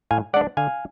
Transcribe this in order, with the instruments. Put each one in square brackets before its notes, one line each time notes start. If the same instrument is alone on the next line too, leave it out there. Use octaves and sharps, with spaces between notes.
[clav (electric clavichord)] A2 F5 G#5
G#3 D5 F#5
D4
D3 F5 G#5